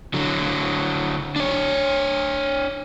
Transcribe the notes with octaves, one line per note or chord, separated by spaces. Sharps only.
D3 F#3
D4 C#5